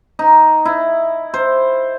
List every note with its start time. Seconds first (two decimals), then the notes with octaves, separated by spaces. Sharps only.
0.19 D#4
0.65 E4
1.34 C5